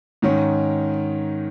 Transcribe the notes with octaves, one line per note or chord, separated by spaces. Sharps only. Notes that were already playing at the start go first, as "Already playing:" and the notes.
G#2 D#3 C#4